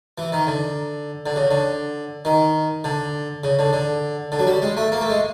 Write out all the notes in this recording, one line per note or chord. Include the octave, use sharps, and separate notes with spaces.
E3
D#3
D3
D3
C#3
D3
D#3
D3
C#3
D3
D3
D3
F#3
G3
G#3
A3
A#3
A3
G#3